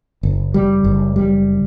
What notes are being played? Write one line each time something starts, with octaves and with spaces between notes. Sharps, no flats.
F#1
G3
F#1
G3